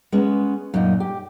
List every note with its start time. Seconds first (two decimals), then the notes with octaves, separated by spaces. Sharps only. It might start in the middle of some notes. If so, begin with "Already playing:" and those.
0.12 G#3 B3 C#4
0.74 F#2 A#2 D#4
1.00 G4